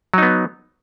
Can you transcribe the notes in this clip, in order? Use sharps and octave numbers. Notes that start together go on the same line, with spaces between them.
F#3 B3 D#4